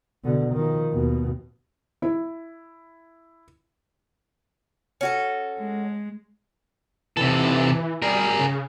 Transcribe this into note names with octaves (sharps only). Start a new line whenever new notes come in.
B2 D3
D#3 F3
D#2 B2
E4
C#4 F#4 A4
G#3
C3 E3 A4
G3 G#4 A#4
C#3